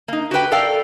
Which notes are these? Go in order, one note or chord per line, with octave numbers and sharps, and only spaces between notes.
A#3 D#4
F#4 G4 B4 G5
A4 A#4 D5 F5 G5